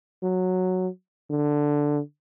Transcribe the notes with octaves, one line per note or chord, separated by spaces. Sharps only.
F#3
D3